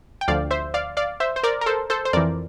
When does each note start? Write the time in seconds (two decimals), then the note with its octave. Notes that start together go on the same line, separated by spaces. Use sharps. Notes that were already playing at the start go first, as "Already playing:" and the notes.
0.21 G5
0.28 D2 D3 F3 D5 F5
0.51 C5 E5
0.74 D5 F5
0.97 D5 F5
1.20 C5 E5
1.36 C5
1.43 A#4 D5
1.61 A#4
1.66 A4 C5
1.90 A4 C5
2.05 C5
2.13 F2 E3 A#4 D5